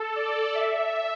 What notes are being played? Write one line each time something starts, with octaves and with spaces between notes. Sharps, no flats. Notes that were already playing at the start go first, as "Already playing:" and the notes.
Already playing: A4
D5
E5